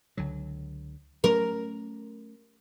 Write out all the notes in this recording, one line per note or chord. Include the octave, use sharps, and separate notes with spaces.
C#2 D3 F#3
F#3 A3 C#4 A#4